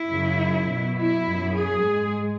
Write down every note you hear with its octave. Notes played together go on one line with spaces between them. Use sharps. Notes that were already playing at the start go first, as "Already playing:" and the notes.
Already playing: E4
F#2 C#3 F#3
B2 F#3
E4
F#2 F#3
G#4
G#2 G#3